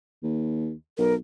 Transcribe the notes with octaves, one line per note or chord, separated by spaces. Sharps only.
D#2
B1 A#4